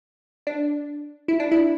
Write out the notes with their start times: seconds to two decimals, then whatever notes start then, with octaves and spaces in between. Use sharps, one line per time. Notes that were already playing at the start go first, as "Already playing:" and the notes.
0.47 D4
1.28 E4
1.40 D4
1.51 E4